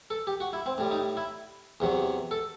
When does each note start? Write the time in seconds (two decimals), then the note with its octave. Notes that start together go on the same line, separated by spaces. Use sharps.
0.10 A4
0.27 G4
0.40 F#4
0.53 E4
0.66 C4
0.78 A2 G3
0.91 D#4
1.17 E4
1.80 E2 C3 F#3
2.31 A4